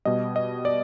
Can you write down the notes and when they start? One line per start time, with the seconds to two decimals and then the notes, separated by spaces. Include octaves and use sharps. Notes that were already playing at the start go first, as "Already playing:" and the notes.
0.05 B2 G3 D#5
0.36 D#5
0.65 D5